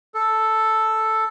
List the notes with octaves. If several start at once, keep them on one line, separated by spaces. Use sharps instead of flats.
A4